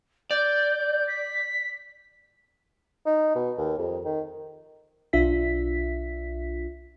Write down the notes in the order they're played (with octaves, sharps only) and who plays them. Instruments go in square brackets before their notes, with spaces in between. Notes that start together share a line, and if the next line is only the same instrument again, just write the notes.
[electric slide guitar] D5 [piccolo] G6
[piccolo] B6
[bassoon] D#4
B2
D#2
F2
D#3
[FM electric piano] B1 D4 F4 E5 B6